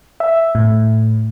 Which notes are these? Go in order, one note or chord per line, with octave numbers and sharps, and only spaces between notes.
E5
A2